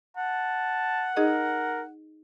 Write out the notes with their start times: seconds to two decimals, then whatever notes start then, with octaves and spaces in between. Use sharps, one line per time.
0.17 F#5 A5
1.17 D#4 G#4 A#4 D#5